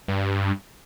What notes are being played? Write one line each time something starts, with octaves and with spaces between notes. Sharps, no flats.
G2